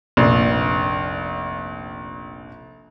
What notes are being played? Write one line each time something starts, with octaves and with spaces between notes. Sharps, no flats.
F1 A#1